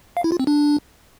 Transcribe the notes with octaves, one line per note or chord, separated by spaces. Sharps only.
F5
E4
F4
C4
D4